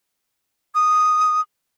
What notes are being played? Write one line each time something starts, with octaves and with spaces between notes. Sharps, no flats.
D#6